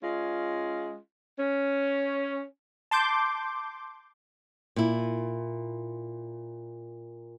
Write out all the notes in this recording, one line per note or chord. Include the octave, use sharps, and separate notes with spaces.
G#3 C#4 F4
C#4
A5 C6 D6 G6
A#2 E4